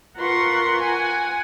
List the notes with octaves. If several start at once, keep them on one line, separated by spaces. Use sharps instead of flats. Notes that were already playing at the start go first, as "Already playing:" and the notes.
F4 A#4 B4 F#5 C6 C#6
F#5 G#5